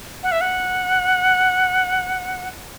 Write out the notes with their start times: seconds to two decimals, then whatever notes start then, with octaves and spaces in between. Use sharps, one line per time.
0.23 F#5
0.32 E5
0.41 F#5